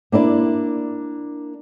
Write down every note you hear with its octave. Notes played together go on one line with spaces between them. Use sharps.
A#3 D4 E4 D5